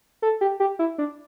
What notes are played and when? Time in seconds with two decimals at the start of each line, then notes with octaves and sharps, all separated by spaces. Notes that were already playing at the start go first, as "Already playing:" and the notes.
0.22 A4
0.41 G4
0.60 G4
0.79 E4
0.98 D4